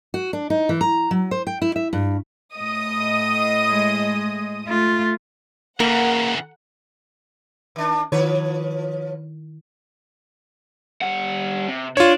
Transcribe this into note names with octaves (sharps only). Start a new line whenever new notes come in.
F#4
D4
D#4
E3
A#5
F#3
C5
G5
E4
E5
G2
A2 D#5 D#6
G#3
A3 F4
C#3 E3 A#3 A#4 F#5
D#3 D4
D#3 F3 E4 B4 C#5
G3 F#5
C3
D4 F4 C#5